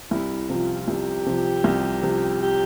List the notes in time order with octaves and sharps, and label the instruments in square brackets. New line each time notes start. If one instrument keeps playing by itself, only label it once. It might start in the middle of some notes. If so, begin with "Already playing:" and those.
[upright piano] C2 [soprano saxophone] E4
[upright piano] C3 F3 [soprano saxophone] F4
[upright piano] C2 [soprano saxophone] G4
[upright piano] C3 F3
C2
C3 F3
[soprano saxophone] G4